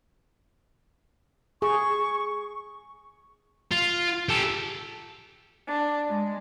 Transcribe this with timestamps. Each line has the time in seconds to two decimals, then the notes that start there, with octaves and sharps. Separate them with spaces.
1.62 G#4 C#6
3.71 F4
4.29 G4 A4
5.68 D4
6.08 G#3